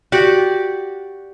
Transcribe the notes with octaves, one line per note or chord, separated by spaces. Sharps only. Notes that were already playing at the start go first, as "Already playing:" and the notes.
F#4 G4 D5 F#5